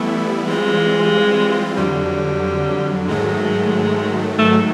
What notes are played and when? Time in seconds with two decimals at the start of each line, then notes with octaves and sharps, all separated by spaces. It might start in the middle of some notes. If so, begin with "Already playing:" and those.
Already playing: E3 G3 A3 B3 E4
0.47 E3 G3 G#3 C4 F4
1.77 F2 D3 F#3 G3
3.08 G#2 D#3 F#3 G#3 A3
4.38 G#2 D#3 F#3 A3